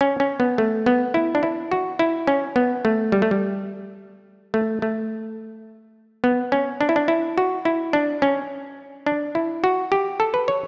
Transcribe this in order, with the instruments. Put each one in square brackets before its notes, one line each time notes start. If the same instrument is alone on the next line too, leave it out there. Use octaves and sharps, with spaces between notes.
[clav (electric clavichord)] C#4
C#4
B3
A3
B3
E4
D4
E4
F#4
E4
C#4
B3
A3
G3
A3
G3
A3
A3
B3
C#4
D4
E4
D4
E4
F#4
E4
D4
C#4
D4
E4
F#4
G4
A4
B4
C#5